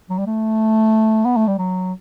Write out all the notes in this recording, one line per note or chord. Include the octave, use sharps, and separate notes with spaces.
F#3
G3
A3
B3
A3
G3
F#3